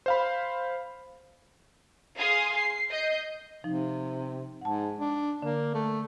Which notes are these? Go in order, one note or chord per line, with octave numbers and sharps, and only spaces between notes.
C5 F5 B5
G#4 F5 G#5 C6 D#6
C7
D#5 G6 C7
C3 F3 D#4
G#2 F#5 A5
D4
D3 A#3
A3